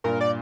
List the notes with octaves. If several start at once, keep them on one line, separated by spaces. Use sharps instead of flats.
G2 A#2 A#4
D5